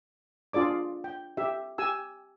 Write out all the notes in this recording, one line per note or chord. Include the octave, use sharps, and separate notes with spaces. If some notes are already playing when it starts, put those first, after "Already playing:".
D4 F4 G#4 D5 D6
G5
G4 E5
G4 G#5 E6